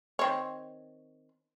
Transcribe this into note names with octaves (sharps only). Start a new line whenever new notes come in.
D#3 C4 C#5